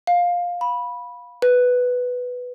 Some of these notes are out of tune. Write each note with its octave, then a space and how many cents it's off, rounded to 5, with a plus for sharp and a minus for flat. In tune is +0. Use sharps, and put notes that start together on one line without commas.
F5 +15
B5 -10
B4 +5